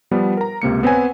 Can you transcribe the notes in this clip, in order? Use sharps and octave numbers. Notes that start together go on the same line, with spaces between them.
F3 G3 B3
A#4 A#5
C#2 C3 A#3 C#7
B3 C4 B4 C#5 G#5